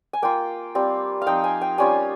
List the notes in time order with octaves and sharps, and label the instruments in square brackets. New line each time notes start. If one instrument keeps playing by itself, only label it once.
[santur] G#5
A#3 F4 G5
G3 C4 F4
F5
F3 C4 D#4 G5
G#5
G5
G3 C#4 F4 G#5